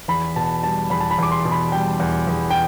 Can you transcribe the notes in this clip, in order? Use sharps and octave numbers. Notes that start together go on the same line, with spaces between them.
E2 B5
B2 A5
G3 A5
E2 B5
A5
B5
E2 D6
C6
B2
B5
G3 G5
E2
E2
G5